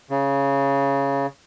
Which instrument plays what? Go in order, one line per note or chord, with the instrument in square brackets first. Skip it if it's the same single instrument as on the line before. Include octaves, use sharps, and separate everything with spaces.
[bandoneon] C#3